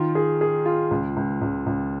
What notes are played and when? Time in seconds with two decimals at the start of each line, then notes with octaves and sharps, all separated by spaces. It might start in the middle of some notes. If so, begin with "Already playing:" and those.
Already playing: D#3 F4
0.15 G#4
0.41 G#4
0.66 F4
0.91 C#2
1.16 C#2
1.41 C#2
1.66 C#2